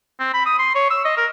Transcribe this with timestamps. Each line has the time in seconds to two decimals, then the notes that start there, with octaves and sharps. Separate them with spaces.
0.19 C4
0.34 B5
0.46 D#6
0.59 C6
0.75 C#5
0.90 E6
1.05 D#5
1.17 A#4